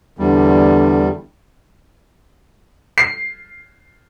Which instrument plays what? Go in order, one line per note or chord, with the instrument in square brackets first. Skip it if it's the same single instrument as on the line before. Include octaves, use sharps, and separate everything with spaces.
[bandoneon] E2 G3 [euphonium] D3
[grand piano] C7